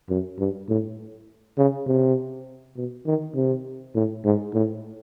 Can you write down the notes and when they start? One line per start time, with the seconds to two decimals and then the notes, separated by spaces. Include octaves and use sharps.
0.10 F#2
0.39 G2
0.69 A2
1.58 C#3
1.87 C3
2.77 B2
3.07 D#3
3.35 C3
3.95 A2
4.25 G#2
4.54 A2